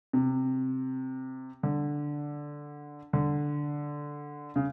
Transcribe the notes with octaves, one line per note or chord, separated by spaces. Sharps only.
C3
D3
D3
C#3